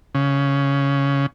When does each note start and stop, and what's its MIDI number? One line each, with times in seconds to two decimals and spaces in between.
0.15 1.26 49